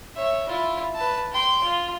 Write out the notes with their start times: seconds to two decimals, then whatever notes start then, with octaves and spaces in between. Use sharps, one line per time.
0.16 C#5 E5
0.48 E4 F4
0.95 B4 A5
1.32 G5 C6
1.63 F4